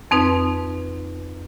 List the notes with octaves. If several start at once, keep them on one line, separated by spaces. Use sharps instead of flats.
F2 C4 D#4 B4